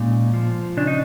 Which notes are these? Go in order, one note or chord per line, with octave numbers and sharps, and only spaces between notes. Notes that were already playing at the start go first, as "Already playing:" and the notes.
Already playing: A#2 G#3 C#4 D#4
F3
C#3 D4
D#4